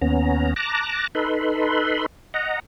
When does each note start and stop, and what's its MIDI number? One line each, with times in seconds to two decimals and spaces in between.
0.01 0.54 39
0.01 0.54 59
0.01 0.54 61
0.01 0.54 82
0.56 1.07 81
0.56 1.07 82
0.56 1.07 86
0.56 1.07 90
0.56 1.07 94
1.15 2.06 63
1.15 2.06 69
1.15 2.06 71
1.15 2.06 83
1.15 2.06 84
2.34 2.60 75
2.34 2.60 78
2.34 2.60 82